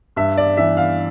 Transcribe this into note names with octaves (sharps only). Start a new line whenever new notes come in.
G2 E5
D5
E3 E5
F5